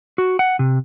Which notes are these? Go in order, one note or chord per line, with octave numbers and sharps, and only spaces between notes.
F#4
F#5
C3